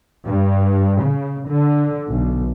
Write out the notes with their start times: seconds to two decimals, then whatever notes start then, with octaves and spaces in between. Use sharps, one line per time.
0.24 G2
1.01 C#3
1.47 D3
2.09 B1